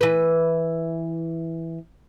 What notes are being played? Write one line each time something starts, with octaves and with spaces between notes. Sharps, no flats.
E3 B4